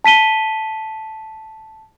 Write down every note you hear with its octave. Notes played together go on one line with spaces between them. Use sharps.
A5 B6 D#7 G7